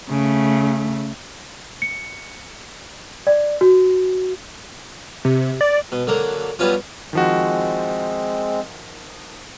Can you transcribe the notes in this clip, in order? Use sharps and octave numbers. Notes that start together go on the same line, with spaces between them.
C#3 A3
C#7
D5
F#4
C3
D5
B2
D3 F#3 A#3
F#3 G3 B3 C#4 F4
D#3 F3 G#3 C4 F#4